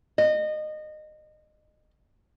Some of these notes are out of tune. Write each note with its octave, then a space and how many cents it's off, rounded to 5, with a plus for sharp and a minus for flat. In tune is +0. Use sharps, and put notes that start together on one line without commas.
D#5 -25